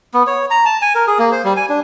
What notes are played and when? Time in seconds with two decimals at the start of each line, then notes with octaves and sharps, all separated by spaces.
0.14 B3
0.27 C#5
0.51 A#5
0.65 A5
0.82 G#5
0.95 A#4
1.07 G#4
1.19 A#3
1.32 C5
1.44 G3
1.57 G#5
1.69 D4